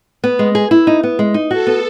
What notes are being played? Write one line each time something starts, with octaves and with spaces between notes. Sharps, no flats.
B3
G#3
G#4
E4
D#4
B3
G#3
D#4
F#4 A4
B3